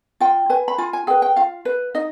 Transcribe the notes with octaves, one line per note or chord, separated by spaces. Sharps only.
F4 G5
B4 G#5
B5
F4 G#5
G#5
G#4 B4 G5
G5
F4 F5
B4
D#4 D#5